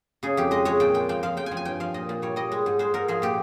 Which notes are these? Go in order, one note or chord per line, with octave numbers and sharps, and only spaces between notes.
C#3 G#4
F2 G4
G#3 D#5
G#3 C#5
A#2 G5
G#3 G5
F3 G5
F3 F5
F3 G5
G#5
F3
G#5
G2 G5
F3 F5
A#2 D#5
A#2
G3 C#5
G3 D#5
G#3
G#2
G#3 C5
G#2 A#4
F3 G#4
A#2 G4